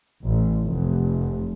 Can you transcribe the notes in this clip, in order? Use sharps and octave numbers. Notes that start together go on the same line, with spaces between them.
A1
F1